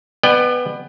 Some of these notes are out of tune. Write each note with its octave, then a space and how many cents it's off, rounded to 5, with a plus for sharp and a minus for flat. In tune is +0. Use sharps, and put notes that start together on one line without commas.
B3 +10 D5 +45 G5 +25